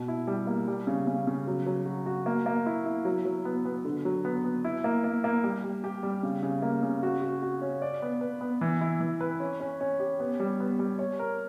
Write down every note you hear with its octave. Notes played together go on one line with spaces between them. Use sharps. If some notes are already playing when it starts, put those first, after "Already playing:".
Already playing: B2
E4
G3
A#3
G3
C#3
C#3
C#3
F#3
F#3
F#4
F#4
A#3
A#3
E4
E4
F#3
F#3
B3
B3
D3
F#3
B3
B3
E4
A#3
A#3
A#3
G3
G3
G4
G3
C#3
C#3
A#3
C#3
F#4
F#4
F#4
C#4
D5
B3
B4
B3
E3
E4
E3
B4
C#4
C#4
C#4
G4
B3
G3
B3
G3
C#5
A#4